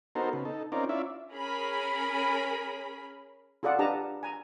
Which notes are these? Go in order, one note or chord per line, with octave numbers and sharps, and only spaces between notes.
B3 D#4 F#4 A4 A#4 C5
C#3 B3
D#4 A4
C4 C#4 D#4 F4 A#4 D5
C#4 E4 F4 D5 E5
C#4 G#4 A#4 B5
F4 G#4 A4 D5 F#5
D4 G4 B4 D#5 A5 A#5
G#5 A#5